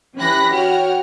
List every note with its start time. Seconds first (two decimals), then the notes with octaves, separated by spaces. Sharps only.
0.17 E3 C#4 G4 B5 F#6 A#6
0.51 F#4 C#5 F#5 G5 F6